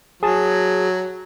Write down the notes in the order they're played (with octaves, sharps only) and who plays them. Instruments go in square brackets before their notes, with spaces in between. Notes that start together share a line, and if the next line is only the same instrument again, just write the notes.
[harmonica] F#3 [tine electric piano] G#4 A5